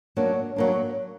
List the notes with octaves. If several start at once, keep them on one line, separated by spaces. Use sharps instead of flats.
F#3 A#3 D4
F#3 A#3 D4